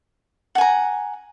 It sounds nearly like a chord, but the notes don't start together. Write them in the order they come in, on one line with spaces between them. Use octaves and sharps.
F#5 G#5 A#5